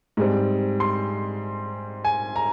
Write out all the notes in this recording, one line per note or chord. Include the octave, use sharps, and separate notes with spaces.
G#2 G3 C4
C6
G#5
A#5